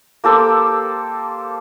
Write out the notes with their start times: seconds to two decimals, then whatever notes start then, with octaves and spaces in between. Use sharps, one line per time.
0.24 A#3 G4 A4 C5